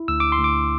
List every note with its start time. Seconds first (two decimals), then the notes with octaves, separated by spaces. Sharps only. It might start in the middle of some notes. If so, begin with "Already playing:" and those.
Already playing: E4
0.08 D2 E6
0.20 D6
0.32 C6
0.38 D2
0.44 D6